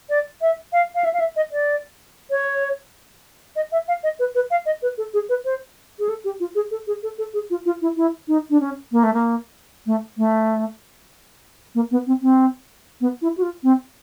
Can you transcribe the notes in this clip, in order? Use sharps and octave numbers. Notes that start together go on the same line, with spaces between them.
D5
E5
F5
F5
E5
F5
E5
D#5
D5
C#5
D#5
E5
F5
D#5
B4
B4
F5
D#5
B4
A4
G#4
B4
C5
G#4
A4
G4
F4
G#4
A4
G#4
A4
A4
G#4
F4
F4
E4
E4
D#4
D4
C#4
A#3
A3
A#3
A3
A3
A#3
B3
C4
C4
B3
E4
F#4
F4
C4